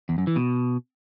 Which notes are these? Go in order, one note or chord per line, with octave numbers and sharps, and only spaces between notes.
E2
F#2
E3
B2